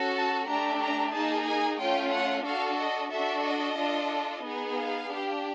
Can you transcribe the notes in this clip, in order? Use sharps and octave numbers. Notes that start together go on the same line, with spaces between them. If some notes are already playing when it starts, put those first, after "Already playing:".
Already playing: C#4 F#4 A4
A5
A3 D4 G4 A#5
A#5
A#3 D#4 G#4 A5
G#5
A3 C#4 F4 G5
F#5
D4 F#4 A4 F5
D#5
D4 F#4 A4 E5
D#5
D4 F4 A4
B3 D#4 G#4
F5
D4 G4